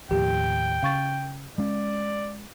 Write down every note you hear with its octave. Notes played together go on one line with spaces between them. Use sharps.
D#2 A2 F3 G4 G5
C#3 F5 C#6 A6
G#3 C#4 D5